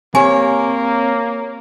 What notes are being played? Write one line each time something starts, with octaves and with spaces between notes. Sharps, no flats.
A#3 C4 G4 C#5 G#5